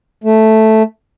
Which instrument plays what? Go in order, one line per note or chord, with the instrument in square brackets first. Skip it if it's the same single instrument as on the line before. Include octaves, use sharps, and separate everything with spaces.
[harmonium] A3